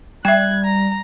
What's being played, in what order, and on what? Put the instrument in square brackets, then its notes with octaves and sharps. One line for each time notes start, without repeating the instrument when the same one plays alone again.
[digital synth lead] G3 [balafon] E5 G5 [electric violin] F#6 G#6
[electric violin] A#5